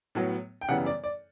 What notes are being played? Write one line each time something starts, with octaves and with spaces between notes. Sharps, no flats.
A2 F#3 B3
G5
F#2 C#3 E3 G3 B3 F#5
D5
D5